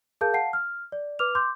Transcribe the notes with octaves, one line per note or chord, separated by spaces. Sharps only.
G#4 A#4 F5 A5 G6
F5 F#5 A5 C7
F6
D5
B4 D6 F6 F7
C6 D6 G6